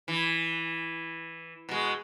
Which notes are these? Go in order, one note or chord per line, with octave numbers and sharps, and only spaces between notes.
E3
B2 G#3